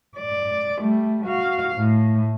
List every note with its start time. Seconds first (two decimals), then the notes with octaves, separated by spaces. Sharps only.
0.17 D5
0.80 G3 A3
1.25 F#4 F5
1.76 A2 A3